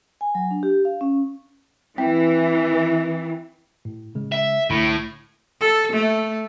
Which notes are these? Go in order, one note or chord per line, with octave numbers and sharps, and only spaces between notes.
G#5
F#3
D4
G4
F5
C#4
E3 C4 G5 B6
A2
C#3 G#3
E5
C2 A2 D3 B5
A4
A3